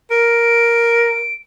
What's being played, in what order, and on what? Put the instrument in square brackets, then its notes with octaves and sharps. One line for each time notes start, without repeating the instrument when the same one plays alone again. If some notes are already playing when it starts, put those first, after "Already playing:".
[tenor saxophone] A#4 [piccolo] D7